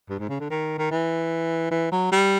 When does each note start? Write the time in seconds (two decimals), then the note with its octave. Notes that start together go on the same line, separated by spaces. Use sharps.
0.10 G2
0.19 G#2
0.29 C#3
0.40 D3
0.50 D#3
0.78 D#3
0.91 E3
1.71 E3
1.92 F#3
2.12 G3